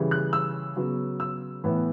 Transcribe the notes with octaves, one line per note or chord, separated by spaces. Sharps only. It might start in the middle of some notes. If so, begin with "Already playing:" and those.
Already playing: C#3 E3 G3
F#6
E6
C#3 F#3 B3
E6
A2 E3 B3